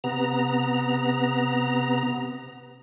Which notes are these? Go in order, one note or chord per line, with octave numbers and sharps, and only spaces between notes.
C3 B3 A#5